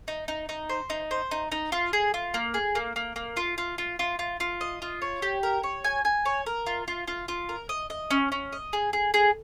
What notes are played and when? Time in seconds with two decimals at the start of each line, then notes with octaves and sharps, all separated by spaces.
0.08 D#4
0.28 D#4
0.49 D#4
0.69 C5
0.90 D#4
1.11 C5
1.31 D#4
1.52 D#4
1.72 F4
1.93 G#4
2.14 F4
2.34 A#3
2.54 G#4
2.75 A#3
2.96 A#3
3.16 A#3
3.37 F4
3.58 F4
3.78 F4
3.99 F4
4.19 F4
4.40 F4
4.61 D#5
4.82 F4
5.02 C#5
5.22 G4
5.43 A#4
5.63 C#5
5.84 G#5
6.05 G#5
6.25 C#5
6.46 A#4
6.67 F4
6.88 F4
7.08 F4
7.28 F4
7.49 A#4
7.69 D#5
7.90 D#5
8.11 C#4
8.32 C#4
8.53 D#5
8.73 G#4
8.93 G#4
9.14 G#4